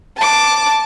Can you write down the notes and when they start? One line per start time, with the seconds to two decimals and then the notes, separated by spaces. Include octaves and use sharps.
0.16 A5 D6